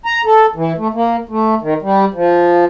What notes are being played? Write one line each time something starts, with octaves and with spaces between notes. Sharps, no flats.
A#5
A4
E3
A3
A#3
A3
D#3
G3
F3